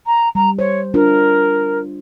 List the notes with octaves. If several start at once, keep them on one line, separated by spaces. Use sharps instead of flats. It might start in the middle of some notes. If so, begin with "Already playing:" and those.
A#5
G3 A#5
C5 C#5
D4 F4 A#4